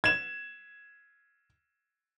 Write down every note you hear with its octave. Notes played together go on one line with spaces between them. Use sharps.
G#6 E7